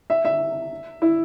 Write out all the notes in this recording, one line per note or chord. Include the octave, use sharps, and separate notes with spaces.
E5
E5
E4